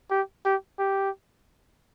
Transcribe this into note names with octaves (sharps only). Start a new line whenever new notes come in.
G4
G4
G4